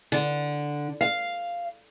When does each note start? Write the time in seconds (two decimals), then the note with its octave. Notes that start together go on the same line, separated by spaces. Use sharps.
0.12 D3
1.01 F5